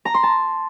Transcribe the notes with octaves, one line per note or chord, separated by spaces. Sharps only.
A#5
C6
A5